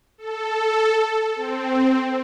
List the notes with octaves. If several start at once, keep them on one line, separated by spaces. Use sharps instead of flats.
A4
C4